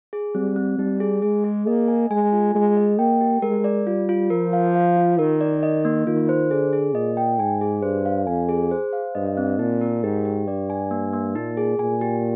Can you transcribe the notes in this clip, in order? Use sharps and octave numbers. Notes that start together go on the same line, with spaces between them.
G#4
G3 C4
C4
G3 D#4
G#4
G#3 G#4
G#4
A#3 D#5
G#5
G#3 G#5
F4
G#3 G#4
D#5
A#3 G5
G4
G#3 A#4
D5
G3 F4
F4
F3 A#4
F5
F5
F4
D#3 A#4
D5
D#5
A#3
D#3 F4
C5
D3 G#4
G#4
A#2 D#5
G5
G#2 G#5
G#4
G2 C5
F5
F2 G#5
G#4
C5
F5
G2 D#5
C4
A#2 D#4
A#4
G#2 G4
G4
G2 D5
G#5
A#3
A#3
A#2 D#4
G#4
A#2 G#5
G4